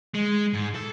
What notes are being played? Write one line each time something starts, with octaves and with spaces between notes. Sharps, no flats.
G#3
G#2
A4